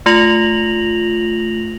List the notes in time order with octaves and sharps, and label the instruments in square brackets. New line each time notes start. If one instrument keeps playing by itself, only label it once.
[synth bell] A3 F4 A#6 F7 F#7